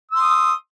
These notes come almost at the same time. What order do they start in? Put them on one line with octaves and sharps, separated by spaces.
E6 C6 D#6